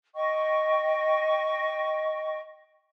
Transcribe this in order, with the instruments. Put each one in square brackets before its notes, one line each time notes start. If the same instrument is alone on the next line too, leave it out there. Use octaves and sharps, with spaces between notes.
[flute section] D#5 G5 C#6